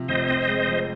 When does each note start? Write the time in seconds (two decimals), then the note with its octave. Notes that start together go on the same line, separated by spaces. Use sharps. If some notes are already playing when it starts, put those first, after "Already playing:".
Already playing: C3 F3
0.08 F1 C5 D#5
0.28 C4
0.48 G#3
0.68 F2